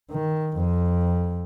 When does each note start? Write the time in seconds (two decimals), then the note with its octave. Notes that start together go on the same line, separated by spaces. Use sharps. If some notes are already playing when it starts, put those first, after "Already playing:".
0.11 D#3
0.57 F2